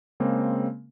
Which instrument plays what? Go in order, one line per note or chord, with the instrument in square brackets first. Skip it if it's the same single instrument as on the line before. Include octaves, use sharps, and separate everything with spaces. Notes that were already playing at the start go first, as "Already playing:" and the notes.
[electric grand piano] C#3 G#3 A#3 C4